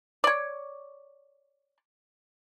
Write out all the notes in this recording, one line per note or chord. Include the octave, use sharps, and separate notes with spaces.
C#5 D5